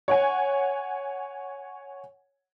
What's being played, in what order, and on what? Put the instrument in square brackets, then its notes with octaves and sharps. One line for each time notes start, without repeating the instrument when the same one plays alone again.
[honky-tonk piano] C#5 F#5 G#5